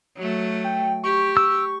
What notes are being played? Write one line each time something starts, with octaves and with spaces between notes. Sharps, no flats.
F#3 A3
G5
G4 C#6
E6